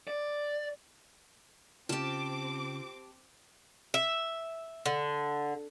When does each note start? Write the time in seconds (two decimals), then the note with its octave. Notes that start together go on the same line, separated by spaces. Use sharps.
0.07 D5
1.89 C#3 C4 F4 G4 A5 D6
3.94 E5
4.86 D3